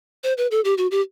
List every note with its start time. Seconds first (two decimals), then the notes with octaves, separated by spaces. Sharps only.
0.24 C5
0.37 B4
0.51 A4
0.64 G4
0.78 F#4
0.91 G4